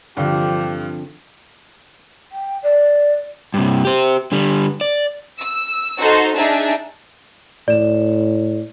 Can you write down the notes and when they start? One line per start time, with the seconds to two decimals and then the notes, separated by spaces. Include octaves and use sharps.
0.17 G2 D3 F3 C4 G4
2.32 G5
2.63 D5
3.54 G2 C3
3.85 G4 C5
4.32 D3 G3
4.81 D5
5.40 E6
6.00 D#4 F#4 A4 C5 C6
6.34 D4 D#4 G#4 E5 A5
7.68 A2 D5 E7